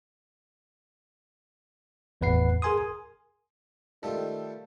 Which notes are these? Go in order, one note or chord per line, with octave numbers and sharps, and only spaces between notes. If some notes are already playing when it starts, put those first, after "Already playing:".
G1 E2 A2 B4 F#5 C7
G#4 A#4 G#5 C6 D#6
D#3 G3 A3 F4 A4